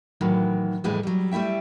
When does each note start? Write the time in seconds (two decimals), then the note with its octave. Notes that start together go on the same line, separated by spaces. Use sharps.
0.21 A2 D#3 E3 F#3
0.84 F2 A2 E3 G3 G#3
1.03 F#3 G3
1.31 G3 A3 E4 E5 G5